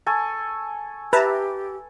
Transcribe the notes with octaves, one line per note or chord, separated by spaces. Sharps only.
A4 G#5 C#6
G4 B4 E5 A5 A#5